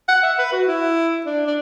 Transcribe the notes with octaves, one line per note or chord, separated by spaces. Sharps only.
F#5
E5
B4
F#4
E4
D4
D4